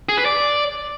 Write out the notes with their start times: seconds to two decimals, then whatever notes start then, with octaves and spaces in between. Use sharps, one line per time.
0.09 G#4
0.17 B4
0.26 D5